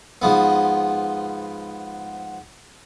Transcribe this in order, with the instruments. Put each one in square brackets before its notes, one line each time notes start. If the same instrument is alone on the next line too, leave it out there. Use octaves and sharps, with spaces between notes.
[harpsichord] G#2 F3 B3